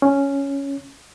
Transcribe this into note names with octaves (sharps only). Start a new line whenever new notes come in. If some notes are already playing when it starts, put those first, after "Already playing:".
C#4